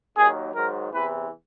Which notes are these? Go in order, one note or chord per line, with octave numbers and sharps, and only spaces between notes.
D#2 D#3 F#3 G#4
G#2 D#3 F#3 A#4
E2 C3 E3 B4